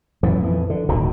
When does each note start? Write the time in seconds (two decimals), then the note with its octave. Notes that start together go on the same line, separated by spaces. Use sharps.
0.23 F#2 A#2 E3
0.43 F2 E3
0.70 D3
0.89 D1 B2 D#3